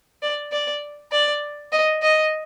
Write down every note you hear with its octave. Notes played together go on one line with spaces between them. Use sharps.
D5
D5
D5
D#5
D#5